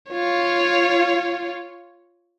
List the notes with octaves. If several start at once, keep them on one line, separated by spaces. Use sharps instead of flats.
F4 C#5